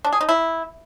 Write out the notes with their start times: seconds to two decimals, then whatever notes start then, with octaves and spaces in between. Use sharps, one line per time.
0.05 D4
0.13 G#4
0.21 D#4
0.29 E4